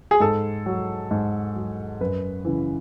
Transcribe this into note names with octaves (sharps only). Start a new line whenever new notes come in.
G#4
G#2 A4
F#3
G#2
F#3
F#2 B4
C#3 E3